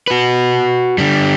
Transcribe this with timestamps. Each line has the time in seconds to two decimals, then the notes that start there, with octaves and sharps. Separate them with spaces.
0.08 F#4 B4
0.98 D3 G3